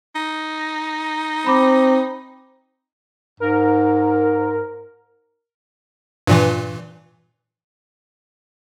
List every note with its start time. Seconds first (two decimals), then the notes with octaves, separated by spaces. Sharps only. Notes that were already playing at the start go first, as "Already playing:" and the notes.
0.15 D#4
1.47 C4 B5 D6
3.40 G#2 A#4
6.27 G2 A#2 E3